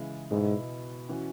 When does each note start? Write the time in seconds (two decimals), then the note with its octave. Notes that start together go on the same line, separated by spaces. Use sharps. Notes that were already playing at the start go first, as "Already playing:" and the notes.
Already playing: C#3 E3 G#3 E4
0.30 G#2 B2 B3 E4
1.09 E3 C#4 F#4